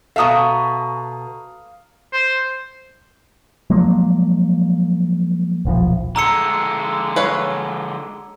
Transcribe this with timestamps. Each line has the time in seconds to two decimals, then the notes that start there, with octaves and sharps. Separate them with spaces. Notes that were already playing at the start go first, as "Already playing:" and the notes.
0.16 B2 F#4 A4 E5 F5 A5 A#5 D#6
2.13 C5
3.70 F3 F#3 G#3 A#3
5.65 D#1 B1 C#3 F3
6.16 D3 G#3 A#5 E6 C#7
7.16 B4 C#5 F5